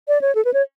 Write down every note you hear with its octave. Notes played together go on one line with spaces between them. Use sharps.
D5
C#5
A4
B4
C#5